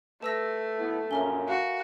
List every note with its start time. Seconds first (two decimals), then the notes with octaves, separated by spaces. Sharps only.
0.22 A3 B4 A5 E6 A#6
0.79 B1 B3 E4
1.11 A#1 F#2 C#4 A#4 E5 G#5 A#5 G7
1.48 F#4 F5